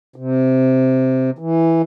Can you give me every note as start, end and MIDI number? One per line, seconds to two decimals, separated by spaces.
0.16 1.31 48
1.39 1.82 52